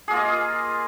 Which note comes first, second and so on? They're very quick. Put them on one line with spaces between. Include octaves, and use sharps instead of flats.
G#4 A#3 F4 D#5